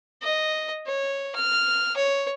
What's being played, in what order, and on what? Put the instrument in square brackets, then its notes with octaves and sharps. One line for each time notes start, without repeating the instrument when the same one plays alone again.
[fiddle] D#5
C#5
F6
C#5